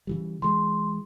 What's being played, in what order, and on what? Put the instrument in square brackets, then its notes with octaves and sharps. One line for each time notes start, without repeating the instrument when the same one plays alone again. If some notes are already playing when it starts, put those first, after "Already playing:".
[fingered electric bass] C#3 E3 G3
[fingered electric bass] E3 G#3 [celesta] C6